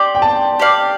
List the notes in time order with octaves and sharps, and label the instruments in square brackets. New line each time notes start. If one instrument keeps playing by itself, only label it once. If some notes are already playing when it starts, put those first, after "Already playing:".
Already playing: [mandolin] G4 D5 [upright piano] C6
[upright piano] G5
A5
[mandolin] G4 D5 F5